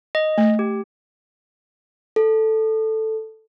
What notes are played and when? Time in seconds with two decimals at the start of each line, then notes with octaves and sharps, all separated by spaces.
0.15 D#5
0.38 A3
0.59 G4
2.16 A4